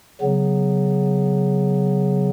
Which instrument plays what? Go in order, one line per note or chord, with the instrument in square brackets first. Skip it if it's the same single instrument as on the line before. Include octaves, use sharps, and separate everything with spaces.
[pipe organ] C#3 F#3 B3